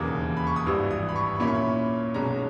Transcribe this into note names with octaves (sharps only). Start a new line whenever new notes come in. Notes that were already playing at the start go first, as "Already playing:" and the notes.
Already playing: E1 D#2 C#3 E3 A#3 D#6
B5
C#6
D#6
G#1 G2 E3 G3 E6
D#6
B5
C#6
A#2 A#3 C#4 E4 B5
C#6
B5
B1 B2 G#3 C#4 A#5